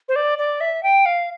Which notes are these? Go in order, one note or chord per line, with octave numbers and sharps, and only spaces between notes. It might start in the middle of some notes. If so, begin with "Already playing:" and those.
C5
D5
D5
E5
G5
F5